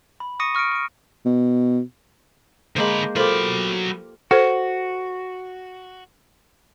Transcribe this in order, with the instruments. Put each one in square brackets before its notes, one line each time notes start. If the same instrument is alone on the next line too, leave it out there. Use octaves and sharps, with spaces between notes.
[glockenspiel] B5
C#6 D#6 A#6 C#7 D#7
C#6 F6 A#6 C#7 D7
C#6 D7
[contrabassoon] B2
[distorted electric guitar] D3 B5 [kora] G#3 A#3 C5
[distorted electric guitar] F#3 B5 [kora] F4 G4 [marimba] A4 A#4 C5
[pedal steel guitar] F#4 [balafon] A4 C5